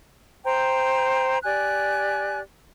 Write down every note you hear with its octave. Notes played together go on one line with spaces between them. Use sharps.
C5 G5 A#5
G4 D5 G#5 F#6